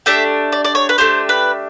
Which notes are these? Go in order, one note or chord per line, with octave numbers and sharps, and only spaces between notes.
A3 D4 G4 E5
D5
D5
C#5
B4
A3 D4 G4 C5
B4